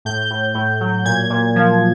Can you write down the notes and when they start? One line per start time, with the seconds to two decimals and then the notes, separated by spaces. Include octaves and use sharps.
0.05 A2 G6
0.30 A2
0.55 A2
0.81 F#3
1.05 A#2 G#6
1.30 A#2
1.56 F3